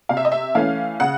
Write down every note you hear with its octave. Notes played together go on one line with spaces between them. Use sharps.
C3 F5
E5
D#5
E5
E3 A3 C#4 F5
C#3 F#5